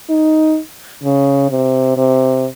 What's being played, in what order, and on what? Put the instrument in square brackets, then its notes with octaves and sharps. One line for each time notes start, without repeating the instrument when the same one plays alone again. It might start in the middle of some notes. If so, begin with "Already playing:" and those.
[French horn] D#4
C#3
C3
C3